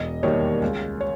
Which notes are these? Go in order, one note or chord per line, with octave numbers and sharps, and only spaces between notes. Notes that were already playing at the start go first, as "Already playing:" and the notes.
Already playing: E1 D#5
D#2 D#3 G3 C#5
C#2
C#5